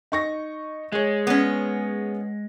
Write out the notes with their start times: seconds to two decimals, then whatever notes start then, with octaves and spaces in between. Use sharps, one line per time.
0.12 D#4 C#6 A#6
0.92 G#3 G#4 C#5
1.27 B3 C#4